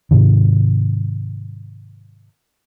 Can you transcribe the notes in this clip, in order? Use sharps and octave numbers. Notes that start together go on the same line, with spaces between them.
G#2 C3 D#3